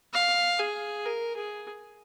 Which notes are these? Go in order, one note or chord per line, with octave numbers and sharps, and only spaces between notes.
F5
G#4
A#4
G#4